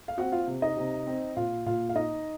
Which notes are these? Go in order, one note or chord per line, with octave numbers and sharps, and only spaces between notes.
F5
C4 F#4 F#5
F4 F5
C3
D#4 D#5
C3
C4
A#2 F4 F5
A#2 F4 F5
F5
D#4 D#5